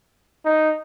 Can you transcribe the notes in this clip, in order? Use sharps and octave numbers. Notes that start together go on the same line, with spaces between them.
D#4